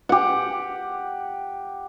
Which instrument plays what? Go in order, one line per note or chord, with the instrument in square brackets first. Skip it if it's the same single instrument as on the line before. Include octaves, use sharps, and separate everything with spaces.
[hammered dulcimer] G4 F#5